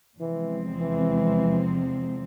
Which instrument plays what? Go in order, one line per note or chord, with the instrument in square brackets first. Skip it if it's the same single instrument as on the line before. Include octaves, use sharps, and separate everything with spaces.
[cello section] E2 C3 F3 G#3 C4 [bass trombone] E3
[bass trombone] E3